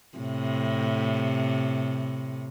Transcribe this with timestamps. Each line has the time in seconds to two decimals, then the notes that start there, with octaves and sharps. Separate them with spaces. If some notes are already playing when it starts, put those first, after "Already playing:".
0.18 A2 C3